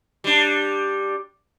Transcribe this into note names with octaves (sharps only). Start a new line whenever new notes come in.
G3 D4